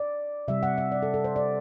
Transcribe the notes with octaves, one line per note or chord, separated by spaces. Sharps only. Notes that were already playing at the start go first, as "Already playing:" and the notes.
Already playing: D5
C3 G3 E5
F#5
E5
D5
A4
A4
C5
D5